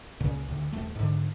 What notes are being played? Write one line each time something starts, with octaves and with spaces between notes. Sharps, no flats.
C#2 A#2 C#3
D2
D#1 A3
G#2 D3